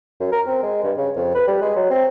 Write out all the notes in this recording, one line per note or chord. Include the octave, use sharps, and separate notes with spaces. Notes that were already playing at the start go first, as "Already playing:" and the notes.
F#2
A#4
C4
G#3
G2
C#3
F2
B4
G3
G#3
F#3
C4